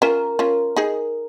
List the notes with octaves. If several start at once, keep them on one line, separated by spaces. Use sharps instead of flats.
C#4 F4 A#4
C#4 F4
D#4 G#4